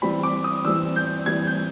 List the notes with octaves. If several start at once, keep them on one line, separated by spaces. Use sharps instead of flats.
E3 G3 C4 B5
D6
D#6
E3 G3 C4 E6
G6
E3 G3 C4 G#6
G6